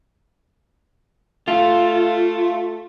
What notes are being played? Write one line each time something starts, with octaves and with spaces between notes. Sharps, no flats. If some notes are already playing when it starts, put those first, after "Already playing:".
A3 F4